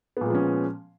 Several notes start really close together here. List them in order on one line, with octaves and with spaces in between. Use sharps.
B3 A#2 G#3 F3 C#4